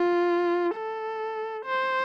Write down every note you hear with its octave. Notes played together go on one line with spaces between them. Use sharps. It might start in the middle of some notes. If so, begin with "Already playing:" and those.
Already playing: F4
A4
C5